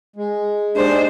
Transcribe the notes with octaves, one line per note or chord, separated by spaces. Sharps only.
G#3
G#3 A#3 D4 D#4 G4 C5